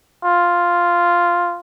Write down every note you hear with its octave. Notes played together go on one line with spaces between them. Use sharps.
F4